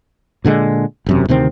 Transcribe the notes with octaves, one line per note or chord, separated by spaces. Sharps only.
A#2 D3 E3 G#3
E1 F#2 C3
D2 C3 D#3 C4